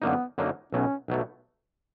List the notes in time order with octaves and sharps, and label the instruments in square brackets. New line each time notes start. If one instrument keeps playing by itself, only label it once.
[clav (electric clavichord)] F#2 D3 F#3 A#3 D#4 [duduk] B3
[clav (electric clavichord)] F#2 D3 F#3 A#3 D#4
[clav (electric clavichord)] B1 B2 F#3 A3 [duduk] C#4
[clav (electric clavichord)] B1 B2 F#3 A3